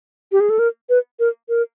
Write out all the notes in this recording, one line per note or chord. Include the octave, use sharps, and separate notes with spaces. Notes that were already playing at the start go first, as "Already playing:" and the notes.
G4
G#4
A4
A#4
B4
A#4
A#4